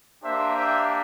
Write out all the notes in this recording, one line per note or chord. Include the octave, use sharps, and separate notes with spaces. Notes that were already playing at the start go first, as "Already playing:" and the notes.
A#3 D4 G4 C5 E5
E5 G5